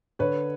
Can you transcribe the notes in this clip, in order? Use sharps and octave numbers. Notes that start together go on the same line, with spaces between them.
D3 B4 C#5